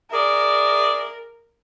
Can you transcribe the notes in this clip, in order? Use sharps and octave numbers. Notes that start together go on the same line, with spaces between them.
G#4 A#4 D5 E5